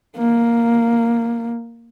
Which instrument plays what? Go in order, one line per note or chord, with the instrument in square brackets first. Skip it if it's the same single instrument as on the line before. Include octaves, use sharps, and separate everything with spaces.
[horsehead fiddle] A#3